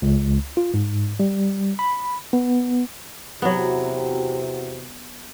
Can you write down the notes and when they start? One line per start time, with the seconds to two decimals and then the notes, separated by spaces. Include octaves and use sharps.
0.02 C#2
0.57 F4
0.74 G#2
1.20 G3
1.79 B5
2.33 B3
3.42 E2 C3 F#3 B3 F#4